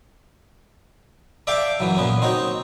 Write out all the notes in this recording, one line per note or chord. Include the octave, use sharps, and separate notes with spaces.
D5 E5 F5 G5 A5 D6
F#2 E3 F#3
A#2 B3 C#4
C4 D#4 F#4 C#5